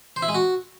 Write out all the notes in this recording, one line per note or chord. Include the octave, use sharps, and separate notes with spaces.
C5
E4
G#3
F#4